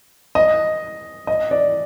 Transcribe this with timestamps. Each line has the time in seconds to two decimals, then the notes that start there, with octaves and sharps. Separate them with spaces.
0.35 D#5
1.27 D#5
1.51 D5